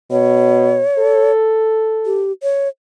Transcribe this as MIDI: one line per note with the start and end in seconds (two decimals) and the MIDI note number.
0.11 0.81 47
0.11 1.32 73
0.99 2.22 69
2.06 2.32 67
2.43 2.68 73